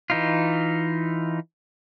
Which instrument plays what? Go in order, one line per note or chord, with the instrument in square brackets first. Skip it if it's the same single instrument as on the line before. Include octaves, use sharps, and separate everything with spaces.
[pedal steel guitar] E3 D#4 F4